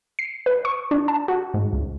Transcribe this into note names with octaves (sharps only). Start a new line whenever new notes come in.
C7
B4
C#6
D4
A5
F#4
G#2
C#2